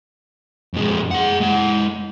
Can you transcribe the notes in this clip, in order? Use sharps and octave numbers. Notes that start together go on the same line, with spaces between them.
F2 G#3
G#4 F#5
G#3 F#5